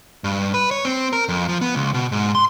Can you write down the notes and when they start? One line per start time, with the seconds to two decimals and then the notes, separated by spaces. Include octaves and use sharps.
0.24 G2
0.54 B4
0.71 C#5
0.85 C4
1.13 A#4
1.29 F2
1.49 F3
1.61 B3
1.75 C#2
1.94 B2
2.12 G#2
2.35 C6